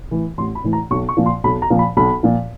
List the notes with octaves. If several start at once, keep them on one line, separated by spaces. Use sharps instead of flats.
A2 E3
A1 C6
B5
A2 E3
A#5
B1 C#6
C#6
A#2 F3
C6
B1 B5
A#5
A#2 F3
B5
B1 B5
A#2 F3